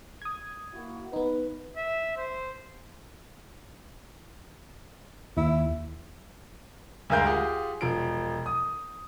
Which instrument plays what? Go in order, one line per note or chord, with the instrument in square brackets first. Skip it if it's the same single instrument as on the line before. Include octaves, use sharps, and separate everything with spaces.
[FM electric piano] D#6 G#6
[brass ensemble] A#3 E4 F#4
[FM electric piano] B3 D#4 [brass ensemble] B4
[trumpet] E5
C5
[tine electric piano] D#2 [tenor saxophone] E4
[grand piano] D2 G2 G#3 A#4 F5 G6
F4 G4 G#4 F#5
E1 F3 D7
D#6